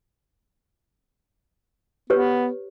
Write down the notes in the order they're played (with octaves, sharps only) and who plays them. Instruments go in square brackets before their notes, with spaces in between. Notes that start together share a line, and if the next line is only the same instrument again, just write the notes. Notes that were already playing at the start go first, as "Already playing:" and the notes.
[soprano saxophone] B3 [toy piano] G4 B4 C#5